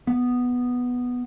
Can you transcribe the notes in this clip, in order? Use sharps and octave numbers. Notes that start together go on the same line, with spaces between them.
B3